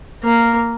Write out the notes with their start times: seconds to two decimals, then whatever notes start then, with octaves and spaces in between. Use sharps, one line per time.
0.24 A#3